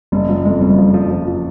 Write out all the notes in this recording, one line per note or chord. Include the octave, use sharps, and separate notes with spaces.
F#1 G3
F3 G3
F2 G#3
F#1 G3
F3
F3
F3
F3